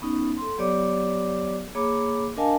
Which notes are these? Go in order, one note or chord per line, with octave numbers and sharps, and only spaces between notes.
B3 C#4 D#4
A4 C6
F#3 B3 G4 C#5 D5 D6
A#3 G#4 C#5 B5 D6
D4 A#4 D#5 F5 G#5 A5